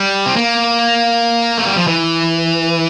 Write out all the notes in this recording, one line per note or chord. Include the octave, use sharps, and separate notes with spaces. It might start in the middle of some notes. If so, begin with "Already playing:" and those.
Already playing: G3
C4
A#3
A3
G3
F3
E3